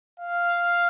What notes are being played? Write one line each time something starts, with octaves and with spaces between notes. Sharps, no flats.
F5